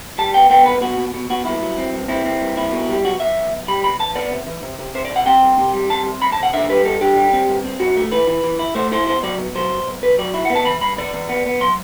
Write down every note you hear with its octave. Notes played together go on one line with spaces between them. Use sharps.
G3 A5
B3 G5
B3 G5
C2 B4
B2 F#4
B2
B2
B2 F#4
G2 E4
F#3
C4
G2
C4 E4
C4
G2
E4
B2
G3
B1 F#4
B1 E5
B1
B1
G3 B5
B2 B5
E3 A5
B3 D5
C3
E3
C3
C3
C3 C5
D5
C3
F#5
C4 G5
C2
C3
G3
C4 A5
C2
C2 B5
A5
C3
F#5
D3 E5
G3 B4
G2 A4
D3 G4
G3
C4
G2
C4
G2 F#4
A3
E3 B4
E3
E3
E4
A3 C5
E4 C5
B2 C5
F#3 D5
B2
F#3 C5
B1
B1
B1 B4
F#3 D5
E4
F#5
B3
A5
E3 B5
G2 B5
E3 D5
E3
B3
B3
F#3 C6